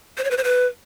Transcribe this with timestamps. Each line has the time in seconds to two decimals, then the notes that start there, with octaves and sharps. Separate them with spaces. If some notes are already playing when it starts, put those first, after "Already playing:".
0.18 C5
0.24 C#5
0.31 B4
0.37 C5
0.44 B4